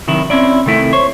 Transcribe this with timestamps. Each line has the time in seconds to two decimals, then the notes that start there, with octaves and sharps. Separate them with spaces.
0.08 C3 D#3 F#3 E4
0.30 C4 C#4 E4 D5
0.66 C3 D#3 A3 E4
0.93 C5 C#5